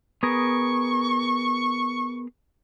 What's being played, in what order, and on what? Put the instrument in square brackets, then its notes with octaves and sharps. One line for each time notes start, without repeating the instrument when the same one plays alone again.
[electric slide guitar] B3 G#4 A#4 [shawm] C#6